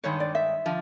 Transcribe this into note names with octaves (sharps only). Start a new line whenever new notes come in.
G2 D#3 G#3 C#5
D5
E5
D3 F3